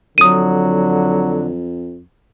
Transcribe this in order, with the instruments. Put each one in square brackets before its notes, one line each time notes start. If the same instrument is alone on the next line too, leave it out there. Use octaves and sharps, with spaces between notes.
[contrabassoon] F2 [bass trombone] D3 [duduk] F#3 [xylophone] D#6 D#7